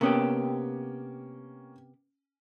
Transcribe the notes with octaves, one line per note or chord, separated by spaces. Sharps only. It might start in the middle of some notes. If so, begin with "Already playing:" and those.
C3 A#3 B3 C#4 G4